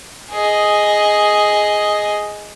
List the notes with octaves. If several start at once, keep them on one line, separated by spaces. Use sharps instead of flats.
G#4 D#5